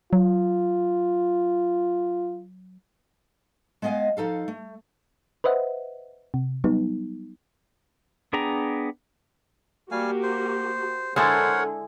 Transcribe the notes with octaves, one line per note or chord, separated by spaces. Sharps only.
F#3 F4
G#3 B3 D#5 F5 G#5
F3 D#4 A4 F5
A3
B4 C5 D#5 E5 F#5
C3
F#3 G3 B3 D#4
B3 D4 G#4 G5 A#5
G3 A#3 F#4 G4 F5 G#5
C5
D3 G#3 E4 A4 A#4 C5 C#5 F#5